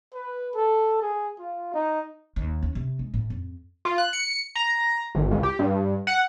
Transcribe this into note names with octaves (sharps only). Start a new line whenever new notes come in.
B4
A4
G#4
F4
D#4
D#2
C#4
C3
G#3
A2
F2
F4
F#6
C#7
A#5
G#1
C#2
G4
G2
F#5